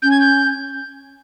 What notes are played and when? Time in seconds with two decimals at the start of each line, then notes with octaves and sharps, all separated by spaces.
0.02 C#4 G6
0.11 G#6
0.20 G6